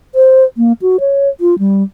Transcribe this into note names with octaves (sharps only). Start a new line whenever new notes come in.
C5
A#3
F#4
C#5
F4
G3